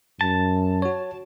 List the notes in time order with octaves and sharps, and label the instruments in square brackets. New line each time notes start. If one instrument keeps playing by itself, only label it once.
[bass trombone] F#2 [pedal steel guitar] A5
[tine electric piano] F#4 C#5